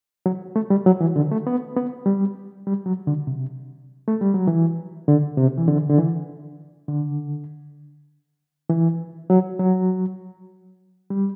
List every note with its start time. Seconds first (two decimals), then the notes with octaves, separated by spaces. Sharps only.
0.26 F#3
0.56 A3
0.70 G3
0.86 F#3
1.01 E3
1.16 D3
1.32 A3
1.47 B3
1.77 B3
2.06 G3
2.67 G3
2.86 F#3
3.07 D3
3.27 C3
4.08 A3
4.21 G3
4.34 F#3
4.47 E3
5.08 D3
5.37 C3
5.57 E3
5.68 D3
5.90 D3
5.98 E3
6.89 D3
8.70 E3
9.30 F#3
9.59 F#3
11.10 G3